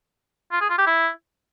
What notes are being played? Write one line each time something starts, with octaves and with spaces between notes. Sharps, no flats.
F4
G#4
F4
G4
E4